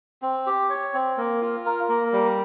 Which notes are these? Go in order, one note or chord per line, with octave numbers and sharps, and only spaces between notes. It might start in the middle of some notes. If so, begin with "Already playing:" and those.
C4
G4
C#5
C4
A#3
F4
A#4
A#3
G3